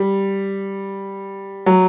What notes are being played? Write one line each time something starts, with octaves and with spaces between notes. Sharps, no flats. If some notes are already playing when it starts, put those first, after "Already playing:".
Already playing: G3
F#3